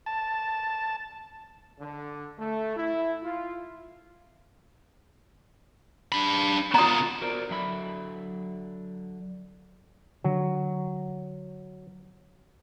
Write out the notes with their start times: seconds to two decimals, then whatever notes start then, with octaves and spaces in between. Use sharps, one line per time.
0.06 A5
1.80 D3
2.39 A3
2.76 E4
3.24 F4
6.12 D4 B5
6.74 B3 F4 A#5 D#6
7.21 F#4 A#4 C5 D5
7.49 D3 F#3 E5 B5
10.24 D3 F#3